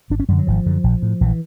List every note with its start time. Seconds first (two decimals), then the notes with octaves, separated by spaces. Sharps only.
0.10 G#1 D4
0.20 C#4
0.28 F#2 D3 G3
0.39 F#3
0.47 G#1 F3
0.66 F#2 D3
0.84 A#1
1.02 A2
1.21 A#1 E3